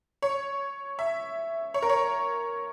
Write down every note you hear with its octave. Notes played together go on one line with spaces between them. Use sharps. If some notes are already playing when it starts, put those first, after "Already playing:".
C#5
E5
C#5
A#4
C#5